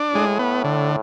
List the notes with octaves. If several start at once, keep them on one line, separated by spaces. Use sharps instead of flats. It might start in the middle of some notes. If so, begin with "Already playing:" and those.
Already playing: D4
A2 G#3
B3
D3